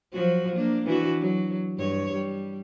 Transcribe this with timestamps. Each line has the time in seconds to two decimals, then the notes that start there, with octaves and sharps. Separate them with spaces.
0.12 F3 F#3 F#4
0.55 A#3 D4
0.86 E3 D4 F#4
1.21 F#3
1.77 G2 C#5
2.13 G3